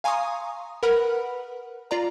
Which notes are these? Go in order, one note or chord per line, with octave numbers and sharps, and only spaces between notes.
F5 G#5 A#5 C6 C#6 D#6
A#4 B4 F#5 B5 F6
F4 D5 A#5